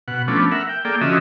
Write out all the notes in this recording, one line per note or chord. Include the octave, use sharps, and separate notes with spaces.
B2 F#5
F3 A3 B3 C#4 D4
A#4 E5 F#5
G5
A#3 G#4 A4 D5 G5
D3 F3 C#4 F#4 D#5 E5